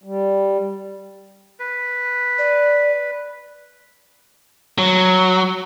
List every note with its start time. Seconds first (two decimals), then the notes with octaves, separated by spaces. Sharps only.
0.04 G3
1.60 B4
2.38 D5
4.78 F#3